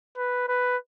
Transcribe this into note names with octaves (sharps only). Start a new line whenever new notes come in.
B4
B4